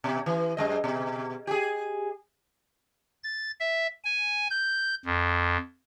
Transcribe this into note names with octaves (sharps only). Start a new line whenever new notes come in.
B2
E3
F#2 G#3 D#5
B2
G4 G#4
A6
E5
G#5
G6
F2